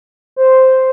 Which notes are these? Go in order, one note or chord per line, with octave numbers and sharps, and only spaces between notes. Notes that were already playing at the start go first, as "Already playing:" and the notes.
C5